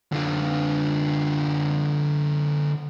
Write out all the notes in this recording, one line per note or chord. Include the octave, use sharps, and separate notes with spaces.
D3 F4